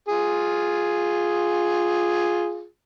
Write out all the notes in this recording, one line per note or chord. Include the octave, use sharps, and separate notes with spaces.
F4 G#4